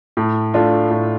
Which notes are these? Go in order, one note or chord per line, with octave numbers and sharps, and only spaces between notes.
A2
A3 D4 F4
A2